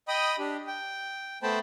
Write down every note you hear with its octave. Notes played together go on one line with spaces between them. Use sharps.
D#5 G5 B5 D#6
D4 G4
G5
A3 B3 C5 G5 A5 B5